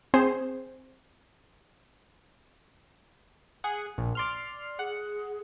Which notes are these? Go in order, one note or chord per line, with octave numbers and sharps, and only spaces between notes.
C4 G#4 C5
G#4 F#5
A#1
D5 C6 F6
G#4 F#5